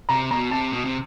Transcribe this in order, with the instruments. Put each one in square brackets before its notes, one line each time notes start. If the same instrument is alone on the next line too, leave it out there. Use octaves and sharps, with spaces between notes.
[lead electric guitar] C3 [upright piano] A#5
[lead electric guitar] B2 [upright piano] A#5
[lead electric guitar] C3 [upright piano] A5
[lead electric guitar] B2
C3